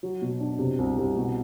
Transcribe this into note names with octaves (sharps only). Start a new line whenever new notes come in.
F#3
B2
D4
C3
C2
C2
B2